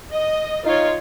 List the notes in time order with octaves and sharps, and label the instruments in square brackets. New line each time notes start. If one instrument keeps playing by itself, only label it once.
[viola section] D#5
[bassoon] D#4 [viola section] F4 C#5